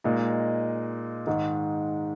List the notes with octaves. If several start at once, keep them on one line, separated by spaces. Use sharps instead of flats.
A#2 G#3 D#4
G#2 D#3 G#3 D#4